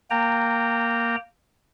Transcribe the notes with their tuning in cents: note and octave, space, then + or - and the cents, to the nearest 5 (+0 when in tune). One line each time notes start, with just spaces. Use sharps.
A#3 +0 G5 +0 A#5 -20